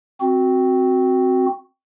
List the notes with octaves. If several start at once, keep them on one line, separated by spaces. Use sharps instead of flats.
C4 F#4